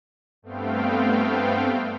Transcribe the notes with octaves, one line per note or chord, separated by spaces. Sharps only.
G2 A3 B3 C4 F5 G5